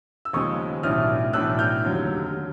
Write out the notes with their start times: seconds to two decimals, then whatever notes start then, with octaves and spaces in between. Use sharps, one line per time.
0.25 E6
0.33 D#2 C#3 F3 G#3 C#6 D#6
0.83 B1 A2 E3 A3 D4 D#6 F6
1.33 B1 A2 E3 A3 D4 E6 F#6
1.59 F6 G6
1.84 F1 D#2 D3 F#3
2.37 D3